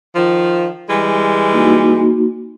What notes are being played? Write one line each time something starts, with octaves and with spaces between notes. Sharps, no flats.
D#3 F3
E3 G3 G#3
A#3 D#4 F#4